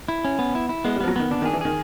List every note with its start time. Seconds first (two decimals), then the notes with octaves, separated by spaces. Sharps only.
0.08 E4
0.25 C#4
0.39 B3
0.55 E4
0.69 E4
0.84 G#3 B3
0.96 G3
1.01 F3 B3
1.08 F#3
1.16 D#3 B3
1.31 D3 D4
1.42 D#3
1.45 G#4
1.53 E3
1.61 D#3 G#4